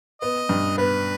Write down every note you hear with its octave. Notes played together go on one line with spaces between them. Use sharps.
B3 D#5
G2
B3 B4